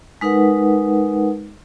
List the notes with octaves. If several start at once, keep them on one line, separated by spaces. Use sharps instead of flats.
G#3 D#4 A#4 B4 F#5